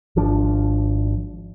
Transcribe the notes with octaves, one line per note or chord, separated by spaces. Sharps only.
G#1 F3 D4